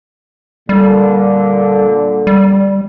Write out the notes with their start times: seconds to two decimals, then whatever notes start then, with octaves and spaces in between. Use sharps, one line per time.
0.69 A#2 D3 G3
2.27 G3